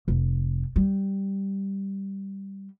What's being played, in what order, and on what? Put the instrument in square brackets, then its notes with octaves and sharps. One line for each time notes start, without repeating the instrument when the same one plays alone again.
[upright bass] F1
G3